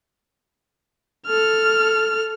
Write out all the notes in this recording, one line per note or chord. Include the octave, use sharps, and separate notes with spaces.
A4 F6